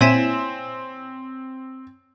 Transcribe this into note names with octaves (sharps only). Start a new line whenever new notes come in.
A#2 C4 E4 C#5 G#5 B6 E7